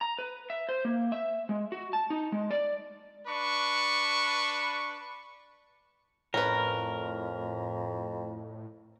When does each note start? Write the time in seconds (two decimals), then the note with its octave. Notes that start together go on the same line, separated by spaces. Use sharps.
0.01 A#5
0.19 B4
0.50 E5
0.69 C5
0.85 A#3
1.12 E5
1.49 G#3
1.72 F#4
1.93 A5
2.10 D#4
2.32 G#3
2.51 D5
3.27 D4 B4 C#6
6.34 F2 A2 C#4 A#4 B4